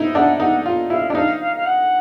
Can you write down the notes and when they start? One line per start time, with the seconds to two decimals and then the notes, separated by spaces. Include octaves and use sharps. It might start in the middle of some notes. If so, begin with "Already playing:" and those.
Already playing: D#4 E4
0.15 D4 F#5
0.40 D#4 F#5
0.66 F4
0.90 E4 F5
1.10 D4
1.15 D#4 F5
1.40 F5
1.56 F5
1.66 F#5